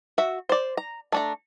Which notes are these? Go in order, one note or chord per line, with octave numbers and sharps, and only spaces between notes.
F#4 E5
C5 D5
A#5
A3 D4 A#5